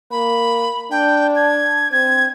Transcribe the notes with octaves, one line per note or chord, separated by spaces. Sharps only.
A#3 B5
D4 G5
G#6
C4 G#6